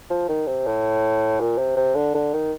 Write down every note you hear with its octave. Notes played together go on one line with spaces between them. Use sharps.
F3
D#3
C3
A2
A#2
C3
C3
D3
D3
D#3